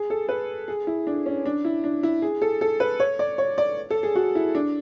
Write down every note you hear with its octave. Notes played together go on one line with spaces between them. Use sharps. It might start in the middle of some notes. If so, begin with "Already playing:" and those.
Already playing: G#4
A4
B4
G#4
E4
D4
C#4
D4
E4
D4
E4
G#4
A4
A4
B4
C#5
D5
C#5
D5
A4
G#4
F#4
E4
D4